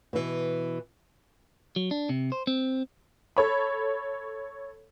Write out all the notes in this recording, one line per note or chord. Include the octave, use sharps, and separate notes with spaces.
B2 E3
F#3
D4
C3
C5
C4
A4 C#5 B5